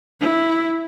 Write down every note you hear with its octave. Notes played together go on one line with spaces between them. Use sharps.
E4